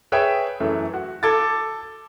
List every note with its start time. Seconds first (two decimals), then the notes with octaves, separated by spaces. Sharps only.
0.12 G#4 B4 C#5 E5 G5
0.60 F#2 E3 A3
0.94 F#4
1.23 A4 D6 G#6 A6